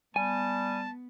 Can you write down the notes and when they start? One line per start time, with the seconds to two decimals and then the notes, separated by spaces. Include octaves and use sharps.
0.16 G3 B3 G#5 A5